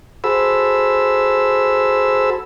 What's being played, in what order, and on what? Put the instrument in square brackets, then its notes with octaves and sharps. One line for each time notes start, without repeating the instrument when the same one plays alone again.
[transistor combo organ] F#4 G#4 A4 C5 B5 E6